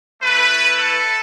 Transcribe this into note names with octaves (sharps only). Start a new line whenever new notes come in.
A3 E4 B4
A4